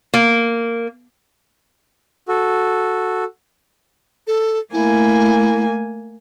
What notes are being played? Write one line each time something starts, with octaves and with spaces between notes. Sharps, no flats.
A#3
F#4 A4
A4
A3 A#3 E4 G#5